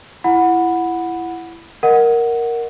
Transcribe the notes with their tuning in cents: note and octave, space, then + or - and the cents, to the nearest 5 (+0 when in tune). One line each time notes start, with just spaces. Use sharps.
E4 +20 F#5 -10 B5 +0
A#4 +0 D#5 +0 F#5 +0